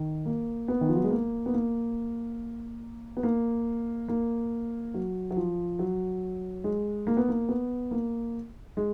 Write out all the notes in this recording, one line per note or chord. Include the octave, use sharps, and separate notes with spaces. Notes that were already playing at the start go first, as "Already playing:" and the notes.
Already playing: D#3
A#3
B3
D#3
F3
F#3
G#3
A#3
B3
A#3
B3
A#3
A#3
F#3
F#3
F3
F#3
G#3
A#3
B3
A#3
B3
A#3
G#3